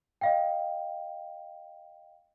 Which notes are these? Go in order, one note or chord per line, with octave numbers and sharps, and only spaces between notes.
D#5 F5 G5